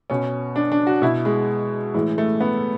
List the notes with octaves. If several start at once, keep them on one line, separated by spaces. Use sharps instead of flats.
B2 C#4
D4
D4
F#4
B2 E4
G#3
A2 E3 G#3
A3
B3